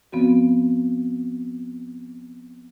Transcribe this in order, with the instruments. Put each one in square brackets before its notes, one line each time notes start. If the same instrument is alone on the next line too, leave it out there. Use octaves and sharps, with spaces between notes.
[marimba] F3 B3 C4 F#4